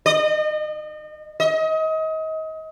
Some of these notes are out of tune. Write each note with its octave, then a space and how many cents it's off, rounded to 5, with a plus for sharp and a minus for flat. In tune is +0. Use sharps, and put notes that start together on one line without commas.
D#5 -35
D#5 +30